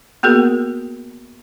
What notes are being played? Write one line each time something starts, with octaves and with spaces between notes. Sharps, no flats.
A#3 B3 F#4 G#4 A#4